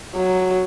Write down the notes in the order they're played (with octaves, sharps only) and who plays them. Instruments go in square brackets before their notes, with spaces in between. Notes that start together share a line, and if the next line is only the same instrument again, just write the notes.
[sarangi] F#3